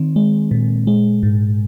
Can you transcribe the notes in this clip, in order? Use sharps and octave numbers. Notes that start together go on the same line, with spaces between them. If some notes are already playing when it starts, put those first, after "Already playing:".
Already playing: D#3 C4
G#3
A#2
G#3
G#2